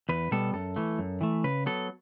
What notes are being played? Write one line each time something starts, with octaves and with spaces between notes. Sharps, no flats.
E2 B4
B2 G3 B3 A4
F#2 A4
E3 A3
F#2
E3 A3
C#3 B4
F#3 B3 A4